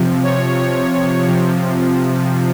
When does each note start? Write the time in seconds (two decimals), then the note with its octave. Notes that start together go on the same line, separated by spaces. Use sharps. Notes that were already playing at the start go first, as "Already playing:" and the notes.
Already playing: C3 F3
0.24 C#5
0.58 C#5
1.26 C3 F3